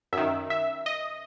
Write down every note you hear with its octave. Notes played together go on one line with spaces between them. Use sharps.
F#2 D#3 E5
E5
D#5